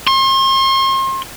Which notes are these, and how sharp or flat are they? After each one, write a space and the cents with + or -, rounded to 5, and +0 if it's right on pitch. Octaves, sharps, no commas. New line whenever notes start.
C6 +40